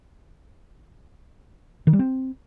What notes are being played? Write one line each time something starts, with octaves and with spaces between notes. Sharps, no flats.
D#3
G3
C4